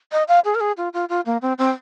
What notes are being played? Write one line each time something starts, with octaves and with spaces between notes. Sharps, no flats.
D#5
F5
G#4
A#4
G#4
F4
F4
F4
A#3
C4
C4